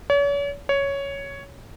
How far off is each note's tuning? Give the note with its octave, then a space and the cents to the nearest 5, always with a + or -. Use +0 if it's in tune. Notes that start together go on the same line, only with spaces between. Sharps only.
C#5 +40
C#5 +5